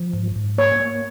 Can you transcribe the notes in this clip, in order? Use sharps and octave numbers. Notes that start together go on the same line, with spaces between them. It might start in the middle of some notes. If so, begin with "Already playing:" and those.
Already playing: F3
G#2
G#2
A#3 C#5
A#3